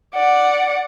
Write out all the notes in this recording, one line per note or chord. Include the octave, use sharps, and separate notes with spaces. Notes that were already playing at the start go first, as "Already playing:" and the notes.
D5 F#5